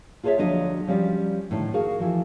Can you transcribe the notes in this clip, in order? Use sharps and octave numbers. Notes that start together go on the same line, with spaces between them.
F4 G#4 A4 C5 C#5 E5
D2 F3 F#3 D4 F#4 D#5
F3 G3 C#4 G4 D5
A2 D3 D#3
F#4 G#4 A#4 F5
E3 F3